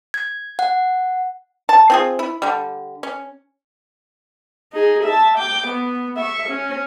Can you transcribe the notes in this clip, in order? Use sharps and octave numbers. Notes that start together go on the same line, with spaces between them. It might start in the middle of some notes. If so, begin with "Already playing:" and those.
G#6
F#5
A5
C4 F4 G#4
E4
D3 G3
C#4
D#4 G#4
E5 A5
G5 D6
B3
E5 C#6
C#4